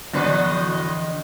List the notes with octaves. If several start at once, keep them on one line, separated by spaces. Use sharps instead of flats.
E2 A2 D3 F3 B4 D#5